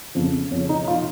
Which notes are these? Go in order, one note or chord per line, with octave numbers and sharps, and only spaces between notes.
F2 C#3 F3
F2 C#3 F3 C#4
D#4
F3 F4